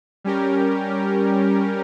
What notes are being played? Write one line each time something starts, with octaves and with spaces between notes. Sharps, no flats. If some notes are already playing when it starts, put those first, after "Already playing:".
G3 C#4 G4 A#4